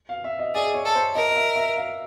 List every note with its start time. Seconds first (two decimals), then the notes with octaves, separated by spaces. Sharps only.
0.09 F5
0.24 E5
0.39 D#5
0.54 G#4 D5
0.74 C#5
0.85 A4
0.95 C5
1.15 A#4 D#5
1.31 D#5
1.36 E5
1.56 E5
1.76 F5